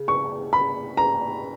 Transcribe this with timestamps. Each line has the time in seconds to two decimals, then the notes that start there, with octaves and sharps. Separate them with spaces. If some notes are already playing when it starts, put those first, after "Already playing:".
Already playing: C#3
0.08 C#6
0.53 B5
0.97 A#5